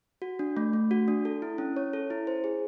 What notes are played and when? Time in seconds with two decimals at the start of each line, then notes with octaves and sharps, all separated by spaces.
0.22 F#4
0.39 D4
0.57 A3
0.73 A3
0.91 F#4
1.08 D4
1.25 A4
1.42 E4
1.58 C#4
1.76 C#5
1.93 A4
2.10 E4
2.27 C5
2.44 G#4